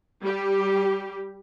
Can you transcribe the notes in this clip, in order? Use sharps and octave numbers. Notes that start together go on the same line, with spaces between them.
G3 G4